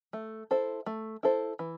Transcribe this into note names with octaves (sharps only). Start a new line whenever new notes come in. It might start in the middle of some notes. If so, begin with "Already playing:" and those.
A3
E4 A4 C5
A3
E4 A4 C5
E3